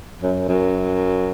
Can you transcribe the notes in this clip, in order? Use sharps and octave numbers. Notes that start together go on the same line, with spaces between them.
F#2
F#2